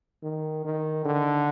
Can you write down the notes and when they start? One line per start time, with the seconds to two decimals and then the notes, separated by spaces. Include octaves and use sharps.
0.23 D#3
0.65 D#3
1.05 D3